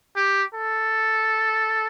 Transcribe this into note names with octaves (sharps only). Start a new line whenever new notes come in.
G4
A4